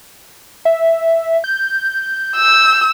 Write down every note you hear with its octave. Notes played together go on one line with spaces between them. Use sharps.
E5
G6
E6